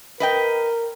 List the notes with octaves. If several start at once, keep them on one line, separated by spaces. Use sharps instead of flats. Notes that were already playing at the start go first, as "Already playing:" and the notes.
A#4 B4 D#5 G5